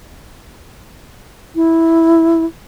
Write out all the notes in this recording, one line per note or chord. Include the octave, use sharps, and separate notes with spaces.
E4